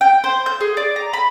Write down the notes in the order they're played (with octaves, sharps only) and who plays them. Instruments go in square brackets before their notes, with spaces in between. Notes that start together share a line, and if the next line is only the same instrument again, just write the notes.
[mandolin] G5
C5
G6
G#4
D5
A#5
B5